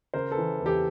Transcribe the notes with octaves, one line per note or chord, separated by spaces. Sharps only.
C#3 A#4 C5
A4 B4
E3
E2
G4 A4